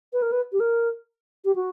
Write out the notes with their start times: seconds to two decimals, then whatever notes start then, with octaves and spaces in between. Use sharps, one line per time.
0.13 B4
0.22 A#4
0.32 B4
0.53 G4
0.60 A#4
1.45 G4
1.55 F#4